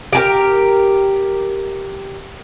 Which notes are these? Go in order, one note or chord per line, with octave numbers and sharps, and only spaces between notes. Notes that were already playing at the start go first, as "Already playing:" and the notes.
G4 G#4 A#4